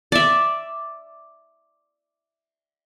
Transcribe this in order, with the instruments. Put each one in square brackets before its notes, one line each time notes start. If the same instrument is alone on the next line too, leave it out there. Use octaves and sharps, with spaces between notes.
[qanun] D5 E5